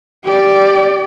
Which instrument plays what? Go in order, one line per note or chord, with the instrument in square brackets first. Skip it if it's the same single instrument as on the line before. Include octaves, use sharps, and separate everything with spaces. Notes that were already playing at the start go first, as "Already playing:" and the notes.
[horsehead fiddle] G4 D5